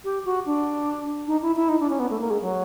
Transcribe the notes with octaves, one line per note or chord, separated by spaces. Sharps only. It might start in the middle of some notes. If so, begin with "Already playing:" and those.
G4
F#4
D4
D#4
E4
E4
D#4
D4
C#4
B3
A3
A#3
G#3
F#3